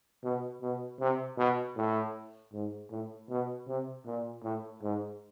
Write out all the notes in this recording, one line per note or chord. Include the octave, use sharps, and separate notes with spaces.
B2
B2
C3
B2
A2
G#2
A2
B2
C3
A#2
A2
G#2